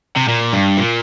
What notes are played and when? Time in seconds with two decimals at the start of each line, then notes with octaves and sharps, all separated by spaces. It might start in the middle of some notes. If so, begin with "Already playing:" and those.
0.16 C3
0.28 A#2
0.53 G2
0.78 A#2